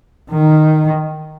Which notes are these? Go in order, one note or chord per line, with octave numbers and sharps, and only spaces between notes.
D#3